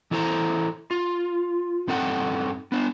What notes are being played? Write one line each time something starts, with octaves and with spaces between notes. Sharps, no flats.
E3 E4 A4 C5 A#5
F4
G2 C4 D#4 A4 F#5 G5
B3 D4